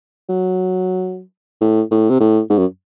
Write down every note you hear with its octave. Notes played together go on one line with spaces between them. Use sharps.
F#3
A2
A2
C3
A2
G#2
F#2